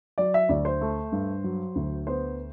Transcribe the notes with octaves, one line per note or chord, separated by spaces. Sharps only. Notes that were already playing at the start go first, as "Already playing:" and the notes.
F#3 D5
E5
D2 D5
C5
A3
G2
F#3
D2
B3 C5